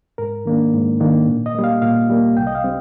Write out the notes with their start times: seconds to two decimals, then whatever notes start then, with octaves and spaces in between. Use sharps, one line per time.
0.18 G#2 A#4
0.45 D#3 A#3 D4
0.73 G#2
1.00 D#3 A#3 D4
1.28 A#2
1.46 D#5
1.55 G3 A#3
1.64 F5
1.82 A#2 F5
2.10 G3 A#3
2.37 C2 G5
2.47 D#5
2.55 F5
2.64 G3 C4